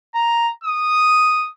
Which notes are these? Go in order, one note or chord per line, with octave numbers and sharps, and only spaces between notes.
A#5
D#6